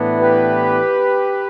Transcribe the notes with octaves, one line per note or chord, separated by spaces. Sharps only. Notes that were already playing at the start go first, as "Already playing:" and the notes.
Already playing: A2 E3 B3 D4
G4 B4